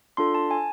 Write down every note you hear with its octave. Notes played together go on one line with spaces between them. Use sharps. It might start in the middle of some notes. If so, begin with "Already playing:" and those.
D4 F4 A4 C6
A5
G#5